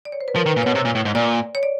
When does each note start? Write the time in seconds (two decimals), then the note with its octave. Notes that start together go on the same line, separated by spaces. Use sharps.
0.05 D5
0.12 C#5
0.21 C5
0.28 B4
0.36 F3 A#4
0.46 D#3
0.49 B4
0.56 A#2
0.63 B2 C#5
0.75 C3
0.85 A#2
0.95 A2
1.05 G#2
1.15 A#2 D5
1.55 C#5
1.63 D5